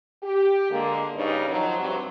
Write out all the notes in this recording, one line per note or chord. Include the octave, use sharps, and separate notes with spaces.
G4
D3 G#3 A#3
G2 C#3 C#4 D#4 C#5 D#5
D#3 F3 F#3
G2 C3 F#3